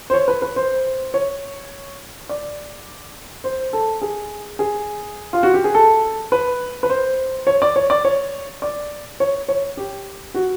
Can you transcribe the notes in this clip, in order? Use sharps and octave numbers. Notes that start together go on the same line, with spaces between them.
C5
C#5
B4
B4
C5
C#5
D5
C5
A4
G#4
G#4
F4
F#4
G4
G#4
A4
B4
B4
C5
C#5
D5
C#5
D5
C#5
D5
C#5
C#5
G4
F#4